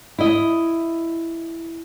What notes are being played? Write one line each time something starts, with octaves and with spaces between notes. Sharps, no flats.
E4 D#5